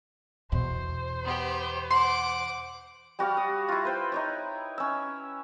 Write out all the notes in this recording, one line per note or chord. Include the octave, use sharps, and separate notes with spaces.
E2 B2 C5
B3 G4
F#5 C6 D6
G3 F#4 D5 F5
D#6
E4 F4
B4 C5 G5
D#4 E4 C#5
C#4 E6